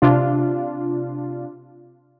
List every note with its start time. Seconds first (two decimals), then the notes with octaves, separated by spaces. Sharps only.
0.02 C3 D4 F4